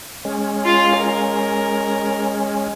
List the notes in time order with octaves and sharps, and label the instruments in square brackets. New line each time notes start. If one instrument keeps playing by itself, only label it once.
[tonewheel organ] G#3 C#4
[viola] F4 F5
A#4